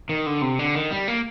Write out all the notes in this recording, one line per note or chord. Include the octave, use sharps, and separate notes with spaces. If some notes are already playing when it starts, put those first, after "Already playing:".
D#3
D3
C3
D3
D#3
G3
A#3